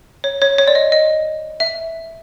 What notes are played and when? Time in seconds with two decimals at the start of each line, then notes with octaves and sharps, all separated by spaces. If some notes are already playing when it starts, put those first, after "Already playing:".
0.24 C#5
0.42 C#5
0.58 C#5
0.68 D5
0.75 D#5
0.92 D#5
1.60 E5